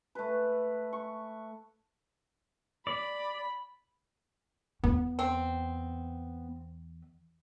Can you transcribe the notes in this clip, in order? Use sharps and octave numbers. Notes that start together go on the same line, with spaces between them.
A3 B4
C#6
D5 B5
E2 B3
C4